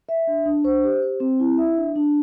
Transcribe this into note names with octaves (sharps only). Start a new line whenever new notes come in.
E5
D4
D4
C5
G4
C5
C4
E4
E5
D4
D4